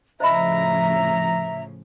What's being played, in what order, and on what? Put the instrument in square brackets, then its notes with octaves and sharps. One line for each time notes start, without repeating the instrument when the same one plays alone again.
[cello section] A2 C#3 F3 [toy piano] C5 D#5 B5 [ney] E5 [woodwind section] A#5